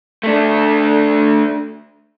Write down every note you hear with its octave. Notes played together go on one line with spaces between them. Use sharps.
A3 D4